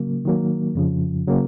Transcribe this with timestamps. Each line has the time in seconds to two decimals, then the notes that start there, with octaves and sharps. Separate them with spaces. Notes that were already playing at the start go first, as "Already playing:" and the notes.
Already playing: C#3 F#3 A#3
0.25 D#3 F#3 A#3
0.75 F2 C#3 F3
1.27 C#3 F#3 A#3